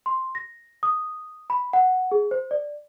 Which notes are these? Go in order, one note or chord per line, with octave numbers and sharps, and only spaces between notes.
C6
A#6
D#6
B5
F#5
G#4
C5
D5